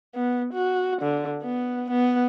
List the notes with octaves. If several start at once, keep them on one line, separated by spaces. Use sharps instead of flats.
B3
F#4
D3
B3
B3